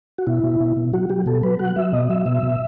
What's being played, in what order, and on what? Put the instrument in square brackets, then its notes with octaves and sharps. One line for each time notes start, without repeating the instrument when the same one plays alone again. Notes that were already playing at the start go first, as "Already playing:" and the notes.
[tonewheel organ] F#4
B2 E4
B2
B2
B2
F#3 F#4
F#3 G4
B2 A4
F#3 B4
F#3 F#5
F#3 E5
B2 D#5
F#3 E5
B2 E5
B2